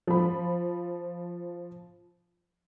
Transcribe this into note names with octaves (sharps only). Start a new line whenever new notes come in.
F3 B5